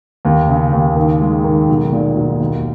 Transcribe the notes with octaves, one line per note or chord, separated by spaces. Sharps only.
D#2
C#3
D#2
D#3
G#3
D#3
B1
A#2
B1
D#2